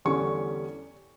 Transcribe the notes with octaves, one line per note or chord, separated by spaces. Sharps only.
E2 D3 G3 C#4 C#6